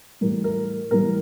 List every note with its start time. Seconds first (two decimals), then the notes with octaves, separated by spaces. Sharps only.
0.21 A2 E3 G3 A#4
0.44 A#4
0.91 A2 E3 G3 A#4